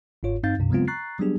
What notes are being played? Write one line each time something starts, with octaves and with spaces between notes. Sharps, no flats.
G1 G#2 F4 C#5
G2 C4 D#4 F5 G6 A6
C#2 G2 C3
C#3 F#3 G#3 B3 C4 F4
A#5 C#6 F#6 A6 C7
F#3 G3 B3 D4 G4 G#4